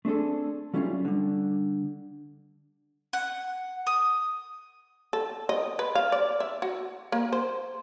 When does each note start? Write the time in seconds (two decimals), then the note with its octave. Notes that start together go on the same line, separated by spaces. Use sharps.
0.05 A3 C4 D4 G#4 A4
0.74 F#3 G3 A3 C#4 D4 F4
1.05 D3 G3
3.13 F#5
3.87 D#6
5.13 A4
5.49 D#5
5.79 B4
5.95 F5
6.12 D5
6.40 E5
6.62 F#4
7.12 A#3
7.33 C5